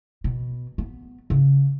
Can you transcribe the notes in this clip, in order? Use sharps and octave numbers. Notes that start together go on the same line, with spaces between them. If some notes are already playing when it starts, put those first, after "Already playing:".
B2
B3
C#3